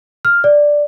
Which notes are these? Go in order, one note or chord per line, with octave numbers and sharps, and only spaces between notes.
F6
D5